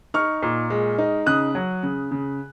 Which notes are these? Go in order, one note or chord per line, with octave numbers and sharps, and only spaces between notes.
D#4 C#6 F6
A#2
G#3
D#4
C#3 D#6 F#6
F#3
C#3
C#3